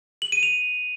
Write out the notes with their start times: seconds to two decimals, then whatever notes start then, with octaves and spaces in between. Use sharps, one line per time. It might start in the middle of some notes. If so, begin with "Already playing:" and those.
0.22 F#7
0.32 D#7
0.43 F7